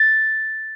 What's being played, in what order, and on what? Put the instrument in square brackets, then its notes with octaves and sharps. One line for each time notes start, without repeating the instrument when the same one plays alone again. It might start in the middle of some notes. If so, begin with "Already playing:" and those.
Already playing: [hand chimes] A6